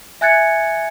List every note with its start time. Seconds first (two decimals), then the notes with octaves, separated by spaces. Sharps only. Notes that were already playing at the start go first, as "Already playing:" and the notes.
0.21 E5 G#5 F#6 G#6 A6 C#7